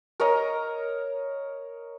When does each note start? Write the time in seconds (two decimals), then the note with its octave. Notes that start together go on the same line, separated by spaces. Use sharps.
0.20 A#4 C#5 D#5 A#5